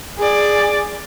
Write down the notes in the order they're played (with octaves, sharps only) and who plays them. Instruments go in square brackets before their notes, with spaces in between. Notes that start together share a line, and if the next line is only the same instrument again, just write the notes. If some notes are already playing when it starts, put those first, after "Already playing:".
[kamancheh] G#4 D5